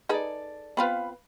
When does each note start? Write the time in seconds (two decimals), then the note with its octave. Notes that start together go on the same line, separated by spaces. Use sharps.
0.09 D#4 G#4 A4 B4 D5
0.77 B3 C4 F4 B4 F5 B5